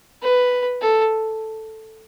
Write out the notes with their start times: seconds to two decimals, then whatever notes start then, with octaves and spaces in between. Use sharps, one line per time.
0.22 B4
0.81 A4